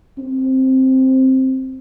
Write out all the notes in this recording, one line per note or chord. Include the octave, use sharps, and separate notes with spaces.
C4